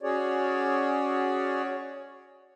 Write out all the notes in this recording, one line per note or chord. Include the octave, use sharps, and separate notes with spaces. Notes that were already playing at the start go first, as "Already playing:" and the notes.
C#4 F#4 G#4 C#5 D5